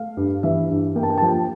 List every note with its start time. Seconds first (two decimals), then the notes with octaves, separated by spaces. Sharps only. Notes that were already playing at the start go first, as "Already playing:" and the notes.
Already playing: A3 F5
0.17 G2
0.43 E3 E5
0.70 G2
0.96 A#3 G5
1.03 A5
1.10 G5
1.18 A5
1.22 F3 G5